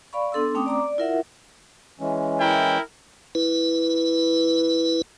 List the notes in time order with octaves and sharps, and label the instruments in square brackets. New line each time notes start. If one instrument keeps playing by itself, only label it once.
[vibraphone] D5 F5 B5 C#6
B3 D4 A4 C6 E6
A3 C4 C#4 G5 D6 D#6
D5 A#5 D6
D5
E4 F4 A#4 E5 F#5
[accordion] E3 G#3 C#4
[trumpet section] E4 A#4 G5
[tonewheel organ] E4 B4